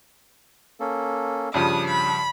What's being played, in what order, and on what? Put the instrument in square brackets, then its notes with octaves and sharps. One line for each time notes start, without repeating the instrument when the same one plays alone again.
[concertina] A#3 C#4 A4
[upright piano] G2 C#3 F3 [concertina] D4 [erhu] D#6
[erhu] B5